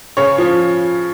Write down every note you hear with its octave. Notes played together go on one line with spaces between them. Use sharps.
C#3 C#5
F3